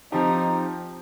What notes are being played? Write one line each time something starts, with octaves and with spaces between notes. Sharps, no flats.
F3 C4 D#4 G4